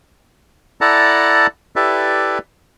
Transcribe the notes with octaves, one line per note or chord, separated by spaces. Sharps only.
E4 A4 D5 F#5 A5 A#5
E4 G4 A4 B4 D5 E5